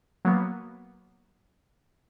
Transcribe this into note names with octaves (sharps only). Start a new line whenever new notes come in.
F#3 A#3 B3